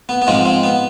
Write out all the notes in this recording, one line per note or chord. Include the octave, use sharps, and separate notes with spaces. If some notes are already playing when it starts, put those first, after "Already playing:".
B3
B3
G#2 F3 G#3 C4
C4
B3